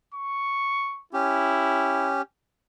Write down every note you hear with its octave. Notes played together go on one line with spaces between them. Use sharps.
C#6
C#4 E4 G4